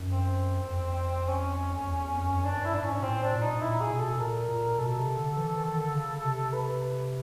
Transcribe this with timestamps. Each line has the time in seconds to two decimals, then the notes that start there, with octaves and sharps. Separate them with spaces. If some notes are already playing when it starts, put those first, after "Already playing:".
Already playing: F#2
0.12 C4
0.70 F2
1.28 C#4
1.87 E2
2.15 F2
2.25 F#2
2.34 F2
2.40 F#2
2.45 G2 D4
2.65 E4
2.74 G#2 D4
2.84 C#4
2.99 A#2
3.03 A2 C4
3.23 D4
3.33 A#2
3.42 D#4
3.62 A#2 E4
3.81 G#4
3.91 B2
4.00 A4
4.14 B2
4.19 A#2 A#4
4.49 A#2
4.78 B2 A4
4.97 C3
5.17 D3
5.36 E3
5.56 D#3
5.76 D3
5.95 C#3
6.24 C3
6.53 B4